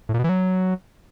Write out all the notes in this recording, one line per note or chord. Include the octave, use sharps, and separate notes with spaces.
A2
A#2
B2
E3
F#3